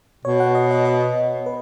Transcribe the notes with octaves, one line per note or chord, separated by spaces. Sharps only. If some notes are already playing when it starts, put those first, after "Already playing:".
B2 C#5
F#5
D#5
D#5
D#5
B4